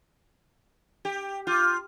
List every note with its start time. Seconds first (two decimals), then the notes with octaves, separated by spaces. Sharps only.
1.05 G4
1.47 F4 D6 F6 G6